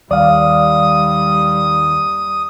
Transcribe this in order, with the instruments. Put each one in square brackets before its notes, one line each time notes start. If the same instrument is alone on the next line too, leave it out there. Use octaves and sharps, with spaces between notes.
[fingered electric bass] D#2 [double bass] G3 [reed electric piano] D5 F5 [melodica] D#6